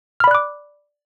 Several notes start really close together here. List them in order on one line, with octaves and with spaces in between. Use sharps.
F6 B5 D5 F#6 D6